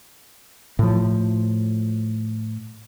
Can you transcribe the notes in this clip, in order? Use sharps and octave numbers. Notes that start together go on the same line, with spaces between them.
A2 F3